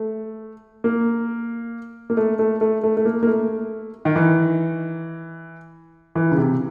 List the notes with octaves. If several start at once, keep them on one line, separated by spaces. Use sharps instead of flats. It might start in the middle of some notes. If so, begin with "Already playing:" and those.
Already playing: A3
A#3
A#3
A3
A3
A3
A3
A3
A#3
A#3
A3
D#3
E3
E3
C#3
C3